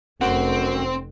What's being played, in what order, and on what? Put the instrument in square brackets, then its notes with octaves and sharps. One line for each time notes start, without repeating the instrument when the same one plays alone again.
[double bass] F1 [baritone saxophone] F#2 [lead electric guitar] C4 [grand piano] F#5